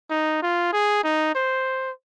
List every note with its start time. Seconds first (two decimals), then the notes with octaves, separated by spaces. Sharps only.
0.10 D#4
0.43 F4
0.73 G#4
1.04 D#4
1.35 C5